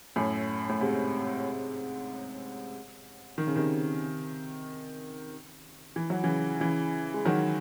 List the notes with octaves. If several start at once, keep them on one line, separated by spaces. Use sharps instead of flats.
F#2 A2
A2
G#2 C3
D#3
C#3
C3 D#3
E3
F#3
C#3 E3
C#3 E3
G#3
D#3 F#3